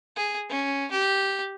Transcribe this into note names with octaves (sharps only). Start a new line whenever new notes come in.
G#4
C#4
G4